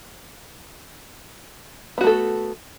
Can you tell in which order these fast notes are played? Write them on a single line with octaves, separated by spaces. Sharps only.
B3 F#4 A3 A4